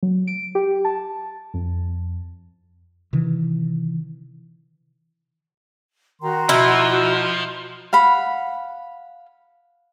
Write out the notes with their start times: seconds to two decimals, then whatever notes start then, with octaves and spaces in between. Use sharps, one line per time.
0.03 F#3
0.27 D7
0.55 G4
0.85 A5
1.54 F2
3.13 C3 D#3 E3
6.21 D#3 F#4 A#5 C6
6.49 B2 F3 E4
7.93 F5 F#5 B5